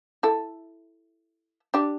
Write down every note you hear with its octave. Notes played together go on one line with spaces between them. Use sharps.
E4 A4
D4 G4